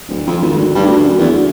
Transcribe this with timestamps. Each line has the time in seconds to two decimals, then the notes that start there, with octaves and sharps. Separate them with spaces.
0.08 D1
0.27 F2
0.41 G#1
0.58 D2
0.75 G2
0.87 D2
1.04 F#2
1.19 E2
1.32 D2